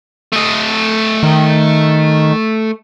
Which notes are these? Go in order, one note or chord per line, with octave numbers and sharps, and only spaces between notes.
A3 D#5
D#3